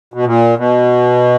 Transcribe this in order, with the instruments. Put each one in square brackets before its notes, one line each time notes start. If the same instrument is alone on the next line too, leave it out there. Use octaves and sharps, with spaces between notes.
[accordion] B2
A#2
B2